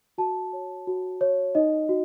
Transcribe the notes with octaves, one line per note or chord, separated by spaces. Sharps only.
F#4 A5
C#5
F#4
C#5
D#4 D#5
F#4